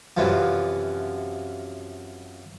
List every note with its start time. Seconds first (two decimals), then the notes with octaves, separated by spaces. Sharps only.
0.17 F#2 C3 E3 F3